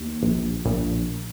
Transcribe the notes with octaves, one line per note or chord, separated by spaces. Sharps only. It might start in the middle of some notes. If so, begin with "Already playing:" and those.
Already playing: D#2
A#1
A#1